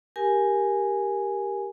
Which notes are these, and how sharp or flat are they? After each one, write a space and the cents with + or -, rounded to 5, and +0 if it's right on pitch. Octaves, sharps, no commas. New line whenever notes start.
G4 +0 A#4 +0 G#5 +0